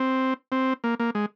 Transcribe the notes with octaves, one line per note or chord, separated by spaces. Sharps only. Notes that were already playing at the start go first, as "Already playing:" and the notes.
Already playing: C4
C4
A#3
A#3
G#3